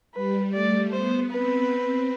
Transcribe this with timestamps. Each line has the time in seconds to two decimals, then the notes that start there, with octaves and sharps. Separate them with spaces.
0.15 G3 B4
0.53 A3 D5
0.93 B3 C5
1.31 C4 B4
1.71 C4